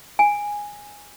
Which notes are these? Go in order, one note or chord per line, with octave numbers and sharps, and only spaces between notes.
G#5